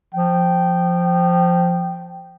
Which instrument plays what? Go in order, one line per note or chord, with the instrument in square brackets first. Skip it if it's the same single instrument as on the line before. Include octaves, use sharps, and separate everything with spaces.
[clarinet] F3 [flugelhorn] G5